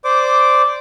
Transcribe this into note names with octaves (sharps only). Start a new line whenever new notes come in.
C5 D5 D6